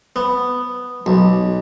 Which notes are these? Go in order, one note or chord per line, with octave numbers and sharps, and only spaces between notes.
B3
B1